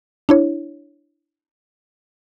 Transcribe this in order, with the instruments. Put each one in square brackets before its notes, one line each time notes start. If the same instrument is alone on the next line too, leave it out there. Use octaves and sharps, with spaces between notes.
[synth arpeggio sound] D4 E4 C#5